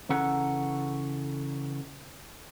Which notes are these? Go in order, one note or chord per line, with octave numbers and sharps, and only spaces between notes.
C#3 E3 C#4 A4 F#5 A#5